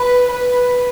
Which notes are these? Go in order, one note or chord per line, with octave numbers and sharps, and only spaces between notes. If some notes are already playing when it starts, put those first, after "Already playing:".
Already playing: B4
B4